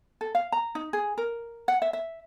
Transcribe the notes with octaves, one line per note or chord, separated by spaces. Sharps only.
A4
F5
A#5
D#4
G#4
A#4
F#5
E5
E5